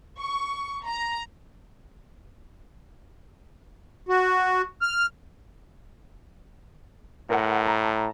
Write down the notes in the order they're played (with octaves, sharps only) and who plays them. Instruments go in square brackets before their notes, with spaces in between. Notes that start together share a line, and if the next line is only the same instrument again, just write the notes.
[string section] C#6
A#5
[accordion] F#4
F6
[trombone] A2 [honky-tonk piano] A#4 F#5
[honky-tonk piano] A5 A#5